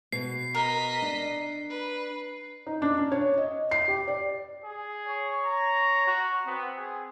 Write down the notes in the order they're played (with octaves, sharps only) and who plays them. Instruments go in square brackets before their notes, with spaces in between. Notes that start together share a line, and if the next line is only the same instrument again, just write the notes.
[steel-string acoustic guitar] B2 [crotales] C7
[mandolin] A#4 [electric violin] D#5 B6
[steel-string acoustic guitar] D4
[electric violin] B4
[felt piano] D#4
D4
C#4
C#5
D#5
C7
G4
D5
[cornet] G#4
[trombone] C#5
[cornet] A#5
[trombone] F#4
[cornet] B3 [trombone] C4
[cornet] G#4